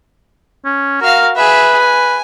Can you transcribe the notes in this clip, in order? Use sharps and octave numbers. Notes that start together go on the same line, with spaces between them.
C#4
F#4 A#4 F5
G#4 B4 E5
G#5